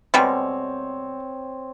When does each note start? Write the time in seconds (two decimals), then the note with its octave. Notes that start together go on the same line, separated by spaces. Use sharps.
0.14 B2 G3 G#3 C4 C#5